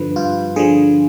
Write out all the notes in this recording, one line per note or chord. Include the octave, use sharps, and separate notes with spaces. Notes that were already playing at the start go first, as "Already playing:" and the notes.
Already playing: G2 D3 F3 B4
G2 F4
D3 F3 G#4